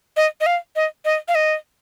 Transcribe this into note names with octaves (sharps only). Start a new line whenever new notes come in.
D#5
D#5
F5
D#5
D#5
F5
D#5